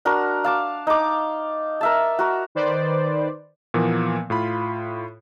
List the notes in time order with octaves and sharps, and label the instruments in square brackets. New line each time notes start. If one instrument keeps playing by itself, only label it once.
[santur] D4 F#4 A#4
F5 A5 D6
D#4 D6
A#4 E5 A5
F#4 A#4
[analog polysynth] D#3 B4 C5 D5
[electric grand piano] A#2 E3 F3 A#3 B3
A2 F4 B5